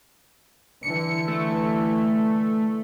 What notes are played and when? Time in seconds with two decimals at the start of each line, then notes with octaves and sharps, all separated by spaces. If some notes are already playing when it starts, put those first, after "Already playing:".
0.83 D3 E3 C#7
1.28 A3